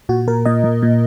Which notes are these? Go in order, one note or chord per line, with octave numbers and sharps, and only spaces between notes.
A#2 F#4
A#2 A#4
A#2 D#5
A#2
A#2